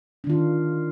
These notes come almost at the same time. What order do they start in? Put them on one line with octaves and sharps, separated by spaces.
D4 D#3 F4